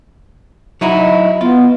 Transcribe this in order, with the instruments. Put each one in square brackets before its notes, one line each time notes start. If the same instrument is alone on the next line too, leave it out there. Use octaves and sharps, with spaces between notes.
[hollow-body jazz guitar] F#3 D#4 E4
[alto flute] D#5
[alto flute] B3 [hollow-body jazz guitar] F4